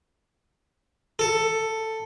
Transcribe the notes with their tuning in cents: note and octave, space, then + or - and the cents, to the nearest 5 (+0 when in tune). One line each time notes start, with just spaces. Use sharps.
A4 +10